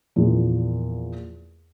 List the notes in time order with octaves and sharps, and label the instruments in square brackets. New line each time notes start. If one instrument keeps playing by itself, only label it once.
[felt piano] E2 A#2 F3